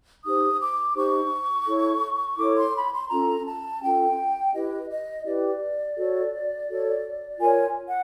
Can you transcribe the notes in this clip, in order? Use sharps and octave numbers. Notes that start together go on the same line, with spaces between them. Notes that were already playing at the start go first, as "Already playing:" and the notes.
D#4 G4 C5 D#6
D6
D#4 G4 C5 C#6
E4 A4 C#5
E4 A4 C#5 D6
C6
B5
C6
C#4 F4 A4 A#5
A5
C#4 F4 A4 G5
E4 G4 B4 D#5
D#5
E4 G4 B4 D5
F#4 A4 C#5
F#4 A4 C#5
F4 A#4 C#5 G#5
F#5